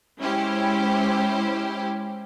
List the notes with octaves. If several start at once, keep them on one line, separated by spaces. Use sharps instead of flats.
G#3 C#4 E4 G4 C5